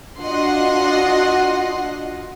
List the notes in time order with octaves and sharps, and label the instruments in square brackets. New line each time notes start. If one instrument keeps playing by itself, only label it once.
[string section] D4 F4 F#4 D#5 F#5 C6